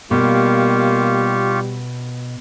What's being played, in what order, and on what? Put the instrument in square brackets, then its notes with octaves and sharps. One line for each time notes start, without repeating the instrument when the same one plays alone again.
[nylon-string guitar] B2 [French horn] G3 [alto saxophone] A#3 [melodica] F4 G4 C#6